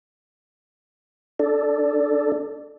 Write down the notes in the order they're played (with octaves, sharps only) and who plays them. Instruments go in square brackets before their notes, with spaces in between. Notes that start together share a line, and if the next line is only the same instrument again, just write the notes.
[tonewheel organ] D4 A4 D5